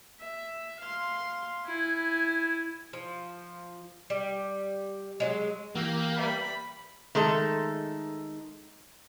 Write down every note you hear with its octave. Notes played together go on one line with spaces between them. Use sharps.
E5
F5 C6
E4 G#5
F3
G3
F#3 G#3
E3 A#3 G4 E6 A#6
G3 B4 E5 A#5 B5
D#3 G#3 A3 A4